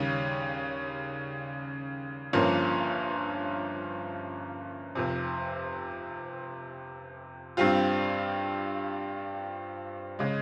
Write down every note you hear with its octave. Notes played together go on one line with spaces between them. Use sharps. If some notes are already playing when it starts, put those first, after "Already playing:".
Already playing: D#2 C#3 G3 C#4
G1 G2 F3 A#3 C#4
F1 F2 C3
G2 G3 C4 F4
C#3 G#3